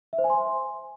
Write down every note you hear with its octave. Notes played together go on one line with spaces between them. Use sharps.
E5
C5
G#5
C6